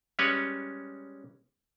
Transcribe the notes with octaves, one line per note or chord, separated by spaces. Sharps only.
G3 G#3 C#4 B4 C#5